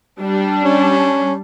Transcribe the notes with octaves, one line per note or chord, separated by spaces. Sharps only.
G3 D4
C#4